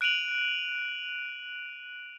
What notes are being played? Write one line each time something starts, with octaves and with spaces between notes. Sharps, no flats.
F#6 D7 D#7 F7 F#7